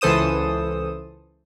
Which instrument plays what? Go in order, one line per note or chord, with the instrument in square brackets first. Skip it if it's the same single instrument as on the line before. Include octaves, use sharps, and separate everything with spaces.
[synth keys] C#2 E3 A4 C5 D#6 E7